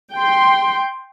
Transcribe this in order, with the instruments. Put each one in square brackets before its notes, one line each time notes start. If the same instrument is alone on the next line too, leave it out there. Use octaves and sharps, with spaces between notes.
[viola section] G5 C6